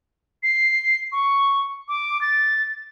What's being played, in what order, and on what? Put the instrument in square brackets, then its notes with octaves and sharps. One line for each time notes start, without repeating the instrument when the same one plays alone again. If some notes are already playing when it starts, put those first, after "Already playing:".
[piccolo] C7
C#6
D6
A6